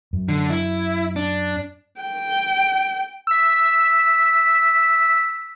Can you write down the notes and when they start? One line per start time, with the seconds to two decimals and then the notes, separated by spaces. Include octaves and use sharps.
0.13 F#2
0.29 D3
0.50 E4
1.16 D4
2.01 G5
3.27 E6 B6